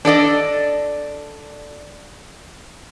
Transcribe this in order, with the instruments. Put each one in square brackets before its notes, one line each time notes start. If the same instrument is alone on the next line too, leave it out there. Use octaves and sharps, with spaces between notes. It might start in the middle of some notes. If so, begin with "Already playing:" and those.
[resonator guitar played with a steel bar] D4 A4 D5 D#5